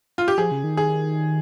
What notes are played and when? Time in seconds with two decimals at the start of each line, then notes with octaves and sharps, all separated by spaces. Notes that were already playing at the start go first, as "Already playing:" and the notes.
0.18 F4
0.28 G4
0.38 F3 G#4
0.51 C#3
0.64 D#3
0.77 G#4